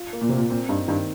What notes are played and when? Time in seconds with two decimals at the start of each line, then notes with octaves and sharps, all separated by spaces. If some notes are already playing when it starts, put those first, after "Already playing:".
Already playing: F4
0.13 A#3
0.21 A#2
0.29 C3 A#3
0.37 A#2
0.50 A#2 C4
0.69 G2 D#4
0.88 G2 D#3